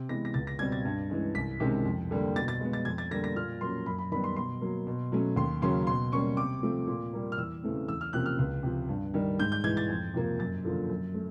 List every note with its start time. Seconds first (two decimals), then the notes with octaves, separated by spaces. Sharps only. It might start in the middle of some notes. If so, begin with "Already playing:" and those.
Already playing: C3
0.09 E3 G#3 B3 A#6
0.25 A#6
0.34 C#2 A6
0.47 A#6
0.59 B2 G3 C4 G#6
0.72 A6
0.85 G2
1.09 E3 G#3 C#4
1.35 C2 B6
1.60 C3 D#3 G#3 C#4
1.85 F2
2.11 D3 G3 A#3
2.36 B2 A6
2.48 A6
2.61 G#3 B3
2.73 A6
2.85 F2 G#6
2.98 A6
3.11 D3 G3 A#3 A#6
3.24 A#6
3.36 A#2 F6
3.61 F#3 A#3 C#4 C6
3.86 F#2 B5
3.98 B5
4.12 D#3 G3 B3 B5
4.24 C6
4.36 B2 C6
4.61 F#3 A#3
4.87 B2
5.12 F#3 A3 C#4
5.36 D#2 C6
5.62 C#3 F#3 A#3 C#4 C6
5.87 B2 C6
6.12 G3 A#3 C#4 C#6
6.37 C3 D6
6.63 F3 A3 C4
6.87 A#2
7.14 G3 A#3
7.32 F6
7.38 E2 E6
7.63 C#3 E3 A3 C4
7.88 E2 E6
8.01 F6
8.13 C3 F3 A#3 C#4 F#6
8.26 F6
8.39 C#2
8.63 C3 F3
8.89 G2
9.14 D#3 G3
9.39 G#2 G6
9.52 G6
9.64 E3 G#3 G#6
9.77 A6
9.89 F2
10.14 C3 F3 A#3
10.39 F#2 A6
10.65 D3 F3 A#3
10.90 F#2
11.14 A3